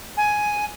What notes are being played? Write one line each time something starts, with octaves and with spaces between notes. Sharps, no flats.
G#5